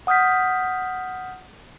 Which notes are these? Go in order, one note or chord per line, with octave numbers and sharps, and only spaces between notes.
F#5 D#6 F6 G6 B6